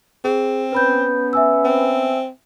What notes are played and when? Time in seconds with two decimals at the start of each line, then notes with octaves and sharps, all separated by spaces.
0.24 C4 G#4
0.72 B3 C#4 B4 B5 G6
1.33 E5 G#5 E6
1.64 C4